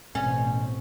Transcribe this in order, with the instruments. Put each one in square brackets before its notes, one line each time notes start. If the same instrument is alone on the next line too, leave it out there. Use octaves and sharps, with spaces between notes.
[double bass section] A1 B2 C4 [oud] C#4